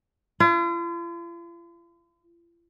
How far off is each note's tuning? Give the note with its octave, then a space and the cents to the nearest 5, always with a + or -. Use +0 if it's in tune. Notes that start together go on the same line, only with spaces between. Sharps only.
F4 -45